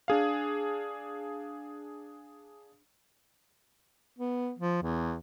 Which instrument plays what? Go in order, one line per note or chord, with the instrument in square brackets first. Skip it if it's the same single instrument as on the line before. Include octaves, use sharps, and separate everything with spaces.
[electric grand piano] D4 G#4 F5
[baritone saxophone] B3
F3
E2